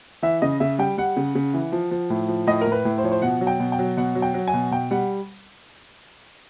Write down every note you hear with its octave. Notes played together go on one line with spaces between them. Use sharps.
E3 E5
C#3 D#5
C#3 E5
G3 G5
G3 F#5
C#3
C#3
E3
F3
F3
A2
F3
A2 D#5
A2 A#4
B4
A2
C5
F3 C#5
C5
B2 F#5
F#3
G5
B2
G5
F#3
B2 F#5
F#3
G5
F#3
G#5
B2
B2 G5
G3 F#5